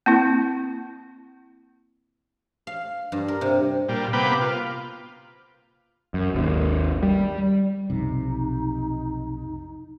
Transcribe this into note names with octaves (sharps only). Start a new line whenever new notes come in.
A#3 C4 E4
F5
G2
A#4
C3
A#2 G3
C3 A#3 B3 B4 G5 D6
F4
F#2
G#1 D#2
G3
B1 F2 C3 D#4